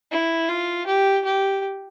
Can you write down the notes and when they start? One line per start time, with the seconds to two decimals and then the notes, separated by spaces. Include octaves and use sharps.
0.12 E4
0.49 F4
0.87 G4
1.24 G4